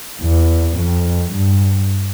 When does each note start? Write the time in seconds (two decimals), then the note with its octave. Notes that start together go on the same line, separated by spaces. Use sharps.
0.22 E2
0.77 F2
1.33 G2